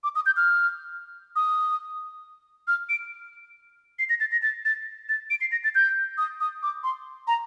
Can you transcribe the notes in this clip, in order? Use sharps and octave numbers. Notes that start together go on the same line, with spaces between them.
D6
D#6
G6
F6
D#6
F6
D7
C7
A#6
A6
A#6
A6
A6
A6
D7
C7
A#6
A6
G6
D#6
D#6
D6
C6
A#5